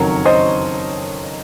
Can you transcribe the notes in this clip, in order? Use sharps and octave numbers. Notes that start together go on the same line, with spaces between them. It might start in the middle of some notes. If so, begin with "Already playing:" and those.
Already playing: F#1 F2 D#3 F#3 A#4 C#5
C5 D#5